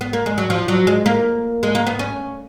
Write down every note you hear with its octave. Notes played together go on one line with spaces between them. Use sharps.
B3
A#3
G#3
F#3
F3
F#3
G#3
A#3
G#3
A#3
B3
C#4